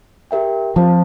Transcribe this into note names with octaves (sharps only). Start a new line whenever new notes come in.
G4 A#4 E5 G5
F3 C4 F4 C5 F5 A5